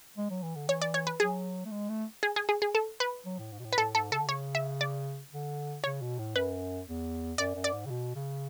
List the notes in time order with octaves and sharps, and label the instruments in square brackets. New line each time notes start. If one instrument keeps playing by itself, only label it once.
[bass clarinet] G#3
F#3
E3
D3
[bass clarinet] E3 [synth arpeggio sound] C#5
[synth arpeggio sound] D5
C#5
B4
[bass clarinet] F#3 [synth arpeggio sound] G#4
[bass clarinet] A3
G#3
A3
[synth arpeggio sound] G#4
G#4
G#4
G#4
A4
B4
[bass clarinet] F#3
A2
G#2
B2
A2
[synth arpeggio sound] B4
[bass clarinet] A2 [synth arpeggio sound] A4
[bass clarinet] G#2 [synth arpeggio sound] A4
[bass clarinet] C#3 [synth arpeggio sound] A4
[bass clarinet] D3
[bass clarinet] C#3 [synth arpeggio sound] C#5
[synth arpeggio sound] E5
D5
[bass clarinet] D3
[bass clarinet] C#3 [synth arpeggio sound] C#5
[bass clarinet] B2
A2
[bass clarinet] F#2 [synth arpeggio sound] B4
[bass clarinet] E2
[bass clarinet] F#2 [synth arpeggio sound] D5
[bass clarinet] F#2
[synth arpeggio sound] D5
[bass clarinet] G#2
C#3
B2
C#3